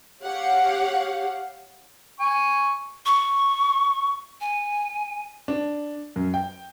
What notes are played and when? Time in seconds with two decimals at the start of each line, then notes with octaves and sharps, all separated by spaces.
0.22 G4 C#5 F5 F#5
2.20 G#5 C#6
3.06 C#6
4.41 G#5
5.48 D4
6.16 F#2
6.34 G5